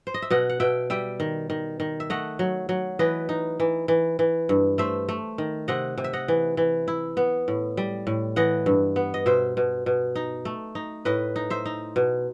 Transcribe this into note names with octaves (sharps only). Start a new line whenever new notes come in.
C5
D#5
E5
B2 D#5 F#5
F#5
B2 E5 G5
G3 E5 G5
D#3
D#3
D#3
E5
A3 D#5 F#5
F#3
F#3
E3 B4 D#5
D#4
E3
E3
E3
G2
A3 C5 E5
A3
D#3
C3 D#5 F#5
C3
E5
D#5 F#5
E3
E3
E4
B3
A2
G3
A2
E3 D#5 F#5
G2
B3
D#5
B2 C5 E5
B2
B2
D#4
A3
D#4
A2 B4 D#5
D#4
C5 E5
D#4
B2